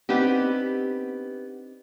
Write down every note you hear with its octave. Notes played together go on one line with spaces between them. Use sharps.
B3 C4 D4 D#4 G4